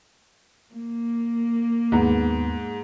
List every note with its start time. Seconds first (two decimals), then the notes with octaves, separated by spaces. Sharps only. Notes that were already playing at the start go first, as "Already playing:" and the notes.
0.73 A#3
1.92 D#2 G#2 B3